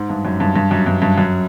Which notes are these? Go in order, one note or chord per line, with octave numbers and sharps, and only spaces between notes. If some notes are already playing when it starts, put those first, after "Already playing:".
Already playing: G#2
G2
F#2
G2
G2
F#2
G2
G2
F#2